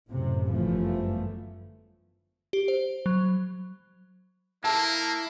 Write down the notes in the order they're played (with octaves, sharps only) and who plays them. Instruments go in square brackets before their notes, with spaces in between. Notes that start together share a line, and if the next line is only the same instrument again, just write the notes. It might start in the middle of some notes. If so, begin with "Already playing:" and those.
[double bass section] F#2 A2 C3
G1 F#2 E3 F3 A3
[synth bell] G4
C5
F#3
[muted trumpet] A#3 [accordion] E4 E6 [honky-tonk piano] A5